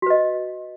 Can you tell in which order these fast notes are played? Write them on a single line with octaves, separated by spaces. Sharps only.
F#4 B4 D#5